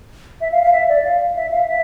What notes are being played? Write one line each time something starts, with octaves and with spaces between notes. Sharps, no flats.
E5
F5
F5
E5
D5
F5
E5
F5
E5